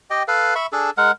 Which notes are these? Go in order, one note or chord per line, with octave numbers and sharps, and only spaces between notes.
G4 D#5 G5
A4 B4 F5
E5 B5 C#6
D4 G#4 A4
G#3 A#4 F#5